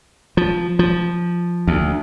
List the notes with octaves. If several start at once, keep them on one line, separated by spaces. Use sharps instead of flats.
F3
F3
D2